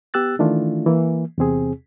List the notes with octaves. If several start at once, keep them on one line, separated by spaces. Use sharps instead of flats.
B3 G4 E6 F#6 A6
D#3 E3 A3 D4 E4 F4
E3 A#3
E2 C3 C4 G#4